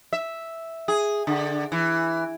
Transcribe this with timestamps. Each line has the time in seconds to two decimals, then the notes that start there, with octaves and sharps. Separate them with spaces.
0.13 E5
0.88 G#4
1.27 D3
1.72 E3